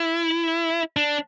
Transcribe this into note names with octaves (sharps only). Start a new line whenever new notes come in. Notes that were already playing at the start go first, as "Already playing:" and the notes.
Already playing: E4
D4